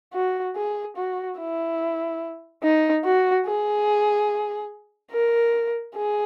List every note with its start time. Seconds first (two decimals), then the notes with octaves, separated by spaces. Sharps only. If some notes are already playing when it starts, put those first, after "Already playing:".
0.14 F#4
0.56 G#4
0.97 F#4
1.38 E4
2.63 D#4
3.05 F#4
3.46 G#4
5.12 A#4
5.95 G#4